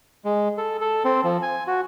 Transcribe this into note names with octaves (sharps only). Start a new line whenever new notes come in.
G#3
A4
A4
C4
F3
G#5
F#4